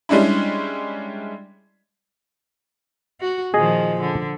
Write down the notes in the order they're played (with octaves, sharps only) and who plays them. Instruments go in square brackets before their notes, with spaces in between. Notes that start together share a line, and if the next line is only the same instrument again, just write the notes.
[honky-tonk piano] G3 G#3 C#4 D4 E4
[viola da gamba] F#4
[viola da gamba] A#2 D#3 F3 [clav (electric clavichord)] G#4 D#5
[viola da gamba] D3